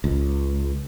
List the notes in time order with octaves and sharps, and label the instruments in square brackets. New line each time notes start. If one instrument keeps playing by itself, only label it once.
[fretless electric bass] C#2